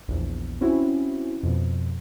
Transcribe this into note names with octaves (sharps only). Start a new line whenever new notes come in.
A#1 E2
C4 C#4 E4 F#4
F2 B2